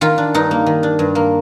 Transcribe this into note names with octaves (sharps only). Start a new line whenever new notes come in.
D#3 F4
D4
G2 D#4
A#3
D#3
D4
G2
A#3